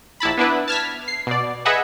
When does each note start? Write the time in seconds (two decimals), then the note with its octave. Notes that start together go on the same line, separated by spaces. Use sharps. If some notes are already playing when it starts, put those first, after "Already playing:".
0.20 A#1 E4 A5 B5
0.37 B3 D4 E4 B4
0.68 A5 F6 G#6 B6
1.08 C7
1.27 B2 D5
1.65 G#4 B4 D#5 E5 F#5 G#5